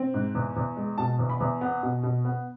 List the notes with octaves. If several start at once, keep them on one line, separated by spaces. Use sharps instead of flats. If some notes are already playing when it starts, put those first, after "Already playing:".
Already playing: C4
G#2
E2
E2
G#3
B2 A5
E2
B5
E2
B3
B2
B2
B3